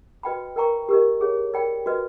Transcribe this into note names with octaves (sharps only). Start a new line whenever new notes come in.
F#4 B4 D#5 G5 B5
A#4 D5 G5 A#5 C#6
G4 A#4 D#5
G#4 C#5 F5
A#4 D5 G5 B5
F#4 B4 D#5